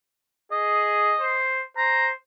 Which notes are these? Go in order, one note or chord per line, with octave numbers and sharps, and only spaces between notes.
G#4 D#5
C5
C5 A#5